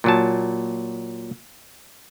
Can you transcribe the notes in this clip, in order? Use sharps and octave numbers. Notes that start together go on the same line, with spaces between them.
A#2 F#3 A5